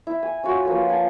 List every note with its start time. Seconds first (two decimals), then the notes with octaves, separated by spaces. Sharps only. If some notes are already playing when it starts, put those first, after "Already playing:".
0.07 E4
0.23 G#5
0.43 C#4 F4 F#4 C#5
0.65 F3 A#3 B4
0.89 G#5 A5